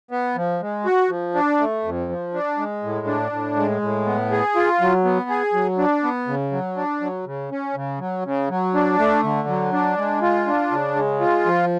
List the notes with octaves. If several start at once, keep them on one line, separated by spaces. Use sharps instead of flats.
B3
F3
G#3
F#4
F3
D4
A3
F2
F3
D4
G#3
A2
D4
A2
G#3
A2
B3
G#4
F4
F#3
B3
G#4
F#3
D4
B3
C#3
F#3
D4
F#3
C#3
C#4
C#3
F#3
C#3
F#3
D4
A3
D3
F#3
D4
G#3
F4
D4
C#3
G#3
F4
F3